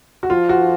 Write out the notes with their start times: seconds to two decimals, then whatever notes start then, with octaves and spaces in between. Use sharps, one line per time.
0.23 F#4
0.30 F3 F4
0.49 F#4